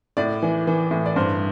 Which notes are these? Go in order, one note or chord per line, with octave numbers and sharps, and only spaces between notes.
A2 D5
E3
E3
A2
D5
G2 C5